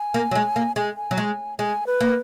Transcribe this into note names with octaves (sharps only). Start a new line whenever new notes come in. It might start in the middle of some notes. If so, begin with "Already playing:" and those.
Already playing: G#5
A#3
F#3
G#3
A#3
G#3 G#5
G#5
F#3
G#3
G#3 G#5
B4
A#3